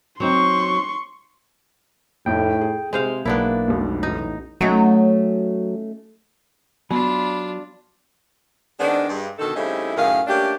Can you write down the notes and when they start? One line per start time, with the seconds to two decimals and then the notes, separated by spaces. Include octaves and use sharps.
0.20 F#3 C4 D#4 C6 C#6
2.26 F1 F2 A2 G5
2.61 G#4
2.93 C3 G#3 C5 F5
3.25 B1 A#3 B3 D4 E4
3.68 F1 C#2 B2
4.03 A1 D#4
4.61 F#3 A3 C#4 D#4
6.91 F#3 B3 D4 F4 B5
8.80 D#3 G#3 B3 C4 D4
9.09 G2 G#3
9.38 B2 D3 D#3 D#4 A4
9.56 C#3 G3 A3 C4 D#4 E4
9.96 F#2 A2 D#3 G#4 A#4 F5
10.27 A3 A#3 C#4 D4 G4